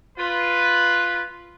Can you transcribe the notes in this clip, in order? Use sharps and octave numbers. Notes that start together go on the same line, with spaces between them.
F4 B4